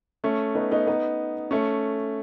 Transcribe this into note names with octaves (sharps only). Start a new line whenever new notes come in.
A3 C#4
B3 D#4
B3 D#4
B3 D#4
A3 C#4